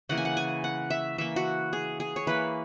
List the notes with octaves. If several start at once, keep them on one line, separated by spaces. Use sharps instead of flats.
C#3 E3 A#3 F#5
G#5
F#5
G#5
F#5
E5
E3 A#3 E5
F#4
G#4
G#4
C#5
E3 A#3 B4